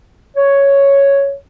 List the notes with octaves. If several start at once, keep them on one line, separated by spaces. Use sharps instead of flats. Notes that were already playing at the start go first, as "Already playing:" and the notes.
C#5